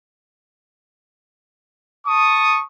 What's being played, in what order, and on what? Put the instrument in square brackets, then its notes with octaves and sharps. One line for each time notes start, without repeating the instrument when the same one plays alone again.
[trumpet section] A5 C#6 D#6